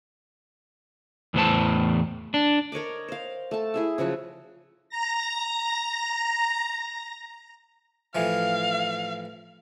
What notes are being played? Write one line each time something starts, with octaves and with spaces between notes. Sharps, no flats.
E2 A2 E3 C5 A5
D4
A#4 C#5 D#5 D6
C5 F5
A3 A5
E4 G#4 E5
C#3 F3 F#3 F#4
A#5 A#6
A2 E3 F3 F5